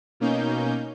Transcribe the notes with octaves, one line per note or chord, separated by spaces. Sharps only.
B2 A#3 C#4 D#4 G6